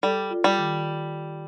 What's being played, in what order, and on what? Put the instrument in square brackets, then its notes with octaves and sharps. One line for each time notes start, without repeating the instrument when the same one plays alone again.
[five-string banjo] G3 [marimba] A4
[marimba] F4
[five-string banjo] G3
[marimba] D#3